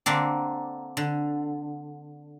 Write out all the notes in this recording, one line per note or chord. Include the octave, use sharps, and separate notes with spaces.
D3 A#3 C4 D4
D3